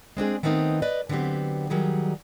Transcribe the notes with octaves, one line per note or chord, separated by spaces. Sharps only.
G#3 C4 D4 G#4
D#3 A3 B3 C4 D#4
B4 D5 D#5
D3 F#3 B3 C4 G4
D#3 F#3 G3 G#4